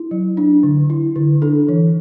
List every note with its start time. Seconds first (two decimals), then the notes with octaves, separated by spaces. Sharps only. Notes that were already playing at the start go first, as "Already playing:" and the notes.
Already playing: E4
0.11 F#3
0.37 D4
0.63 D3
0.90 E4
1.16 D3
1.42 D4 A4
1.69 E3